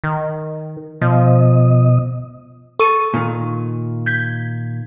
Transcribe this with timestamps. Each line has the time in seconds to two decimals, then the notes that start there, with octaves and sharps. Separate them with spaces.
0.04 D#3
1.01 B2 F3 D#5
2.80 A4 C#6 D#7
3.14 A#2 D#3
4.06 G6 G#6 B6